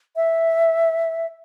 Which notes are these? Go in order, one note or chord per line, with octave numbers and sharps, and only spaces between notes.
E5